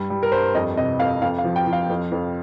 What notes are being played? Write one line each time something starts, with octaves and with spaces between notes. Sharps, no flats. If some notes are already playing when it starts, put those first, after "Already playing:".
Already playing: G2 G3
G3
A#4
G2 C5
F2 D#5
C3 D#5
F2 F5
F2 F5
F5
F3
G5
F3
F5
F2
F2